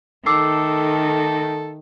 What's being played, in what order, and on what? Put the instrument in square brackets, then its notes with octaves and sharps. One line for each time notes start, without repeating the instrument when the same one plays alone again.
[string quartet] D#3 A3 [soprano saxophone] A4 [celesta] D6 E6 C7